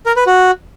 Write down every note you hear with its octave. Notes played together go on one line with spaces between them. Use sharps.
A#4
B4
F#4